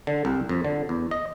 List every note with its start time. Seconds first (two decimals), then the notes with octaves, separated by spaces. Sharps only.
0.07 D3
0.25 C2
0.49 F2
0.65 D3
0.89 E2
1.11 D#5